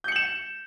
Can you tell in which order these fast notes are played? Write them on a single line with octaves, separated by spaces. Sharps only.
G6 C#7 F#7 E7